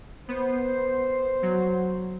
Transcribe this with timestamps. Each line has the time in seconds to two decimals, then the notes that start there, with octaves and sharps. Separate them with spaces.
0.28 B3 C5
1.43 F#3